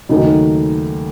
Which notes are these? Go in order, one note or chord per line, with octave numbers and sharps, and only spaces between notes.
D#2 C#3 F#3 A3 D#4